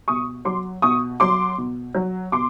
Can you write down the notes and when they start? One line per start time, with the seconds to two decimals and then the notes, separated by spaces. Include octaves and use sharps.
0.08 B2 C#6 D#6
0.45 F#3 C6 D6
0.82 B2 C#6 D#6
1.20 F#3 C6 D6
1.58 B2
1.95 F#3
2.32 B2 C6 D6